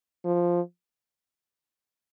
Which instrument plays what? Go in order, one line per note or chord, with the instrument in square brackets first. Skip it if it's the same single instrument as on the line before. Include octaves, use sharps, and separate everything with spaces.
[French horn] F3